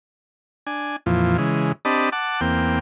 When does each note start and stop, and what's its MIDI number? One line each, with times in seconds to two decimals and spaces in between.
0.67 0.96 62
0.67 0.96 80
1.06 1.37 41
1.06 1.37 46
1.06 1.37 52
1.06 1.37 53
1.38 1.72 49
1.38 1.72 52
1.38 1.72 56
1.85 2.10 60
1.85 2.10 62
1.85 2.10 67
1.85 2.10 75
1.85 2.10 81
1.85 2.10 83
2.12 2.41 78
2.12 2.41 81
2.12 2.41 86
2.41 2.79 40
2.41 2.79 58
2.41 2.79 60
2.41 2.79 79